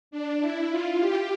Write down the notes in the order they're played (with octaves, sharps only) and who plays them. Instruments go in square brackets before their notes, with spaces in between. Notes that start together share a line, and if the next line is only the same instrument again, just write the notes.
[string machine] D4
E4
F4
G4